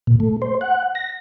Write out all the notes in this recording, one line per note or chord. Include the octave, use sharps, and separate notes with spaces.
A#2
A3
C5
F#5
A#6